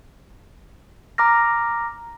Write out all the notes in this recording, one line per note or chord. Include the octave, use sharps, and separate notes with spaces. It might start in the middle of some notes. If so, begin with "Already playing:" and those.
A#5 D6 F6 A#6